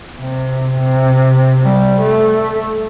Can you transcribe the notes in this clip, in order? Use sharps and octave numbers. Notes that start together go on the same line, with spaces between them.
C3
C3
G3
A3